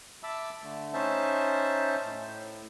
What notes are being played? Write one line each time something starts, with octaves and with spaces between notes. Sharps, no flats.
E5 A5 B5 D6 E6
D3 A3
C#4 D#4 C5 E5 A5
A2